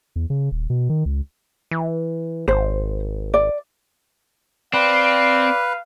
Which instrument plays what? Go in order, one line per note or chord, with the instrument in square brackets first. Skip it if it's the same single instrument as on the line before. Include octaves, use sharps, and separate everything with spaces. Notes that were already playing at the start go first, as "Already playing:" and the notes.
[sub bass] E2
C#3
D#1
B2
D#3
C#2
[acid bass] E3
[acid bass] G#1 [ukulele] C5
[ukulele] D5
[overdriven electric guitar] C4 [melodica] B4 [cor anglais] D5 [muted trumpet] F5